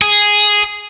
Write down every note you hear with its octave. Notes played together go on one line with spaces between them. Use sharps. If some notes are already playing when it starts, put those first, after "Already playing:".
G#4